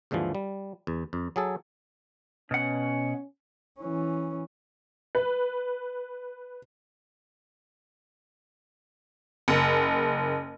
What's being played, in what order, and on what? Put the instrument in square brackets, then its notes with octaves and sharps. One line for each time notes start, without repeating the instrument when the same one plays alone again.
[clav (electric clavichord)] D#2 G#2 D3 E3 F3
G3
E2
F2
F#3 G#4 A4
[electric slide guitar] B2 F#5 [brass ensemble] C#4
[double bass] E3 C#4
[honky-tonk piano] B4
F#1